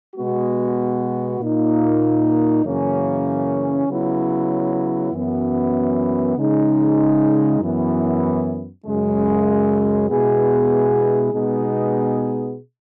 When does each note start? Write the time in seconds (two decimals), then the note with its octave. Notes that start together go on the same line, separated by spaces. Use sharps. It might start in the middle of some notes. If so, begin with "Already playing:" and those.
0.14 B2 G#3 B3 F#4
1.39 A#2 A#3 D#4
2.64 F#2 C#3 E3 A#3 C#4
3.87 C#3 F#3 B3 E4
5.12 F#2 E3 B3
6.36 C#3 G#3 D#4
7.60 F#2 E3 B3
8.85 F#2 C#3 G#3
10.09 B2 G#3 B3 E4 G#4
11.34 B2 G#3 B3 D#4 G#4